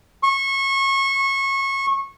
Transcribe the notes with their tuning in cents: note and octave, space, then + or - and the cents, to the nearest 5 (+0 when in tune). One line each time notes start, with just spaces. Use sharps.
C#6 -25